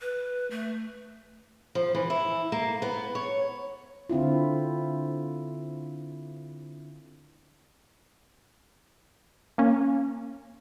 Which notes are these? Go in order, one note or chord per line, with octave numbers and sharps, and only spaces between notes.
B4
A3
F3
E3
E4
A#3
B3
C#5
D3 C4 E4 F4
A#3 C#4